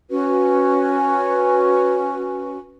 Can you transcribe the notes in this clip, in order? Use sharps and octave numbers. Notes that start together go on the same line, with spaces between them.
C#4 F#4 B4